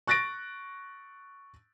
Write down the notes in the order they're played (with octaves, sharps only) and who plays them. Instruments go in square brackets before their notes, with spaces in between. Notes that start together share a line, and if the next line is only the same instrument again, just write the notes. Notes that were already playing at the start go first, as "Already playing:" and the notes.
[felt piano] C#6 F#6 A6 A#6 D7